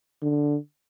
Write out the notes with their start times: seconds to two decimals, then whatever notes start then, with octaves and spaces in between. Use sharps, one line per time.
0.22 D3